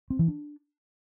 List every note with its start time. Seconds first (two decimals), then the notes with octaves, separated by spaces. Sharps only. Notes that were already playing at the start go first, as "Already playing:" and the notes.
0.10 C4
0.19 E3
0.28 D4